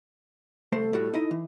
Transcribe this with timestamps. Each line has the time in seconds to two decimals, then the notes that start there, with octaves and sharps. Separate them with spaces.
0.72 C2 A3 A4 C5
0.93 A2 G3 F#4
1.13 D#4 E4 D#5
1.31 E3